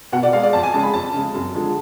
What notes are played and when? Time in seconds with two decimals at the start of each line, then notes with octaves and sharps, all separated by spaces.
0.12 B2 F#5
0.23 D5
0.33 G#3 F5
0.43 D5
0.53 F2 A5
0.63 G#5
0.74 C#3 G#3 A5
0.83 B5
0.94 F2 A5
1.14 C#3 G#3
1.34 F#2
1.55 D3 F3 G#3